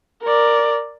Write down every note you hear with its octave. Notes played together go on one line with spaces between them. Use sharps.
A#4 D5